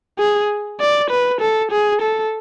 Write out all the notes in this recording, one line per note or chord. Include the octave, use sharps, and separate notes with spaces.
G#4
D5
B4
A4
G#4
A4